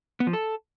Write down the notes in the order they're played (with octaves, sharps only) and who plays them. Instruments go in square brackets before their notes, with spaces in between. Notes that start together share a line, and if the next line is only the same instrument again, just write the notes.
[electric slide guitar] B3
F3
A4